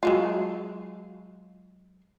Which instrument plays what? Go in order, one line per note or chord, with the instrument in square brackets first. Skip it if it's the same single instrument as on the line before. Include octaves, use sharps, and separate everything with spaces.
[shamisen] F#3 G#3 F4